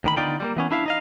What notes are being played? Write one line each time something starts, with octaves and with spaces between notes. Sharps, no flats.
D2 D#3 B5
D3 B3 D#4 F4 D5 G5
G3 G#3 A#3
E3 B3 C#4
D4 E4 E5 F5
D#4 D#5 F5